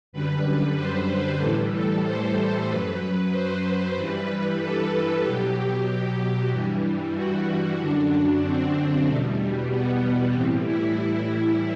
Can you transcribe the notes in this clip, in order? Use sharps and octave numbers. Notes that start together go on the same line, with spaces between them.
F#2 D3 G3 B4
C5
B4
A2 E3 G3 A4
A4
C5
F#2 F#3 B4
C5
G2 E3 G3 B4
A4
B2 F#3 G4
G2 E3 G3
F#4
F#2 D3 F#3 D4
C4
E2 B2 G3 A3
G3
B3
A2 E3 G3 C4
E4